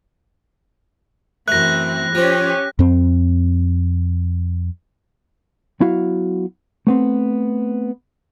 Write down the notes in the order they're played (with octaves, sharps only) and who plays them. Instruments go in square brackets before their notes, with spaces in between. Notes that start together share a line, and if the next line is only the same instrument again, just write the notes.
[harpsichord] F#2 A3 [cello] E3 C4 [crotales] F#6 A#6
[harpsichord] F3 C4 [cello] C#4 G4
[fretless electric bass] F2 C4
[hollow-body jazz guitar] F#3 B3 E4 F#4 F5
A3 B3 C4